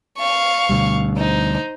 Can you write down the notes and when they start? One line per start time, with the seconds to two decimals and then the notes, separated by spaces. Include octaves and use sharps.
0.18 F5 C#6
0.69 D2 B2 G3
1.18 D#4 C5